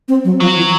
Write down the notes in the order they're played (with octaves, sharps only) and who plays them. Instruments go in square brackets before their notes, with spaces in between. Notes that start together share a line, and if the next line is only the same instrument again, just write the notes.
[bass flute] C4
F#3
[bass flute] F3 [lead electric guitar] F#3
[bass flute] E3